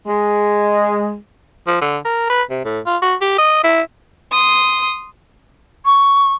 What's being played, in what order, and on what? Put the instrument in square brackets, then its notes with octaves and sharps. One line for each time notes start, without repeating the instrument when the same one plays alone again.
[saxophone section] G#3
[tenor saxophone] F3
D3
A#4
B4
C3
A2
F4
F#4
G4
D#5
E4
[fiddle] C6 D#6
[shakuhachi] C#6